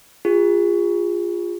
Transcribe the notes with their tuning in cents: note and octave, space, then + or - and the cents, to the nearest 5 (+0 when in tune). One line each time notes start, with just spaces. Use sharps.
F4 +0 G#4 -30